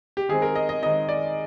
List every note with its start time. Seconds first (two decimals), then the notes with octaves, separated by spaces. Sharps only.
0.17 G4
0.29 D#3 G#3 C4 D#4 G#4
0.42 A#4
0.55 D#5
0.69 D#5
0.82 D#3 G#3 C4 D#4 D#5
1.09 D5